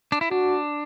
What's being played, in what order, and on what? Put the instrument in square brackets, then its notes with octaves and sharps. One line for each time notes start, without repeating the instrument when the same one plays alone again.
[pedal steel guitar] D4
E4
[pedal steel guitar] D4 [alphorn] F#4